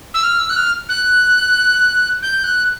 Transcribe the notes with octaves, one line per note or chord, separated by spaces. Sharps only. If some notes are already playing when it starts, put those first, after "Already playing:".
E6
F6
E6
F#6
F6
F#6
G6
F#6